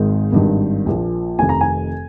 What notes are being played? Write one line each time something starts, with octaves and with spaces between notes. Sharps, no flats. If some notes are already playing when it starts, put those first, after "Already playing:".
Already playing: G#1 G#2 D#3
G#1 G2 D#3
A#1 A#2 F3
F1 F2 D#3 G#5
A#5
G#5